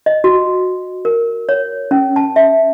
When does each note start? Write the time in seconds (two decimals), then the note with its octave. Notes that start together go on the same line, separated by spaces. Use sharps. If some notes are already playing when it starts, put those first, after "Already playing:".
0.06 D#5
0.24 F#4
1.05 A#4
1.49 C#5
1.91 C#4
2.16 A5
2.36 E5